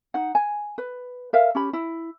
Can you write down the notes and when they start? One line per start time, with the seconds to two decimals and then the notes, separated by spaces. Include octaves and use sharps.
0.14 D#4 F#5
0.35 G#5
0.78 B4
1.33 A#4 E5 F5
1.55 C#4 G4 B5
1.73 E4